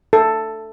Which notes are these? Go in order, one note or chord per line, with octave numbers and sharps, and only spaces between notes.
A4